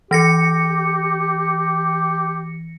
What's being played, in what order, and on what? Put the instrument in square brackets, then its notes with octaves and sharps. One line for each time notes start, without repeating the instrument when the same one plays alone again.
[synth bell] E3 A#6 C#7 [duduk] G4